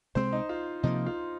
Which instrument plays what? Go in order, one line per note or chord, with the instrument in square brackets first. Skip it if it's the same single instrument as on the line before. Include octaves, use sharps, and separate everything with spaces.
[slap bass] C3 G#3 C4 [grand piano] C5
[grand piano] D#4
F4
[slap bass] C3 F3 A#3 [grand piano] D#4
[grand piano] F4